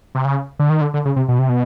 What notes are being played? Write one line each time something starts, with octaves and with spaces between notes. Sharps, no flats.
C3
C#3
D3
D#3
D3
D3
C#3
C3
B2
C3
B2